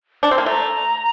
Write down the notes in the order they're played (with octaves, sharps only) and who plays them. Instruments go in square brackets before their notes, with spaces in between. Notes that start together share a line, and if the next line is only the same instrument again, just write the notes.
[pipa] D4
C4
[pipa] A#3 [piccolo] C6
[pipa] A3 [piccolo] A#5